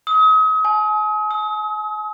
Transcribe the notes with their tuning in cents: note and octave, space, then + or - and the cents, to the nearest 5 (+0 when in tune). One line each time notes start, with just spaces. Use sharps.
D#6 +40
G#5 +40
E6 -40